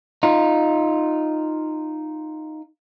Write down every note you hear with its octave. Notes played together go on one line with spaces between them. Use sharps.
D#4 F4